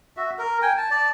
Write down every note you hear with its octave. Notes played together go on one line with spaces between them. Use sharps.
F#4 E5
A#4
G5 G#5
A5
D5 A5